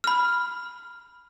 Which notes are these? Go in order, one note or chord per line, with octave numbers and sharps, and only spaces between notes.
B5 F6